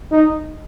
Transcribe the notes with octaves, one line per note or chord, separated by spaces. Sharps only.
D#4